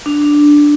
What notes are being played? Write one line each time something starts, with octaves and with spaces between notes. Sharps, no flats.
D4
D4